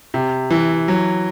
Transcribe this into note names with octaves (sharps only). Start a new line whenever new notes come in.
C3
E3
F#3